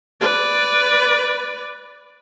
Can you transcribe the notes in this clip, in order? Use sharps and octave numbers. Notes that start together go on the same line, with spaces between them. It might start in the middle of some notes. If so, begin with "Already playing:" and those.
B4 D5